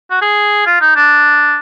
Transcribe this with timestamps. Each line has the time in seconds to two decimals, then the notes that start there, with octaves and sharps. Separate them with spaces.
0.11 F#4
0.22 G#4
0.66 F4
0.81 D#4
0.96 D4